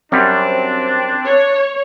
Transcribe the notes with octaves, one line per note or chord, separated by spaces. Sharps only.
F#2 F#3 G3 C4 D4
C#5